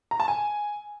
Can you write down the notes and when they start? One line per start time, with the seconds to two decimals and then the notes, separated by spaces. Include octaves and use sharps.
0.11 A#5
0.20 A5
0.28 G#5